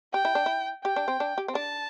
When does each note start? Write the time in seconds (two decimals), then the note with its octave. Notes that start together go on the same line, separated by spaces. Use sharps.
0.14 G4 G5
0.25 E4
0.35 D4
0.46 E4
0.84 G4 G5
0.96 D4
1.08 C4
1.20 D4
1.38 G4
1.48 C4
1.55 D4 A5